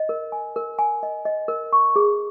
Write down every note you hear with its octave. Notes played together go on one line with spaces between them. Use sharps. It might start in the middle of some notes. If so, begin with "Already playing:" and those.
Already playing: D#5
A#4
G#5
A#4
G#5
D#5
D#5
A#4
C#6
G#4